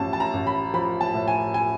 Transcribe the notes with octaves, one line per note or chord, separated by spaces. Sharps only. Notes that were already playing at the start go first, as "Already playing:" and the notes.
Already playing: A1 A2 F3 A5
A5
A#5
A1
B5
F3 B5
A5
A2
G#5
G#5